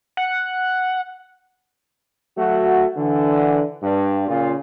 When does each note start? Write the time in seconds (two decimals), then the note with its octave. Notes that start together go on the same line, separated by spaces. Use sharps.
0.17 F#5
2.38 F#3 A3 F#4
2.96 D3 E3
3.82 G2
4.27 A#2 C#3 F4